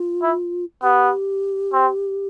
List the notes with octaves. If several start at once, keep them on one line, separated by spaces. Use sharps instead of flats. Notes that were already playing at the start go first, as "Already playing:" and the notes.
Already playing: F4
E4
B3 G4
C4